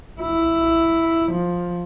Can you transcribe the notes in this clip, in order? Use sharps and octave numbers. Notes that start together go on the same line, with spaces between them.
E4
F3